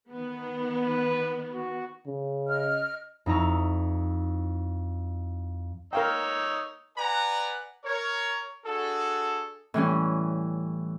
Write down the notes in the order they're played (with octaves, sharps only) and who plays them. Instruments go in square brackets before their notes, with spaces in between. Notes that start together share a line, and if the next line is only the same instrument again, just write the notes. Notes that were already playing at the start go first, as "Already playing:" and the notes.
[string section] D#3 B3
[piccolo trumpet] B4
F#4
[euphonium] C#3
[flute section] D#5 F6
[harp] F2 D#4 E4 A#5 C#6
[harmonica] D#4 C#5 E6 [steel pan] A#4 F5 G5
[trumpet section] B4 D5 F#5 G#5 A#5
A#4 C#5
D4 F#4 G#4 A4
[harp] A2 E3 G3 C#4